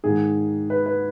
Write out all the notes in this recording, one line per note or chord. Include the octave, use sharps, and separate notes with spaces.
G#2 D#3 G#4
B4
B4